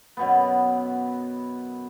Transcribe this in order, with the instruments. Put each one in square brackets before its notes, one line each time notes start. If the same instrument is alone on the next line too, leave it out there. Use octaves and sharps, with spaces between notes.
[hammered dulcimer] F#2 B2 B3